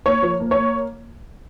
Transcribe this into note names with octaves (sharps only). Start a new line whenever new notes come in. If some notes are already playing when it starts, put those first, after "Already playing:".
A#3 C#5
F3
A#3
C#5
A#3